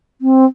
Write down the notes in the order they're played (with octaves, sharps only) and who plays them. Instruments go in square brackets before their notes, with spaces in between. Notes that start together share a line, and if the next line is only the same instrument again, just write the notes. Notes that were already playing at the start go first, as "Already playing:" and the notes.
[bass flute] C4